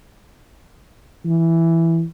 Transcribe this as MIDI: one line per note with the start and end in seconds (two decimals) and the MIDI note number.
1.25 2.04 52